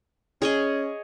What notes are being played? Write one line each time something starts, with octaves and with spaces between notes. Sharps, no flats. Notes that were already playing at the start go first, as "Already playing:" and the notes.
C#4 G#4 C#5 D#5